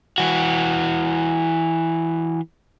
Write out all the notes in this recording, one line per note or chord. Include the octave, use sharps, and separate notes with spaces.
E3 F#4